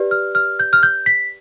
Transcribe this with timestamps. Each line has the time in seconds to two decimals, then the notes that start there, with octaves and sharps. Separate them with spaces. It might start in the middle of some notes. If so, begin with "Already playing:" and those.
Already playing: G4 B4 D5
0.11 F6
0.35 F6
0.59 G6
0.73 F6
0.83 G6
1.06 B6